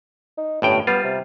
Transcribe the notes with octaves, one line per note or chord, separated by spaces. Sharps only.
D#4
G1 A2 C#4 G5
G3 B3 F4
C3